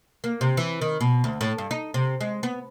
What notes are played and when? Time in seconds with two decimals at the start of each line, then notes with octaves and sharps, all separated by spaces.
0.24 A#3
0.41 C3
0.57 E3
0.82 D#3
1.01 B2
1.24 D2
1.41 A2
1.58 G2
1.71 D#4
1.94 C3
2.21 G#3
2.43 B3